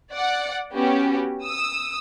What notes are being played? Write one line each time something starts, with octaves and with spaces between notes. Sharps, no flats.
D5 F#5
B3 C#4 F#4 G4
D#6 E6